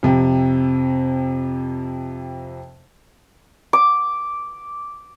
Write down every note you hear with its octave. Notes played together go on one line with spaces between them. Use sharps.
F2 C3
D6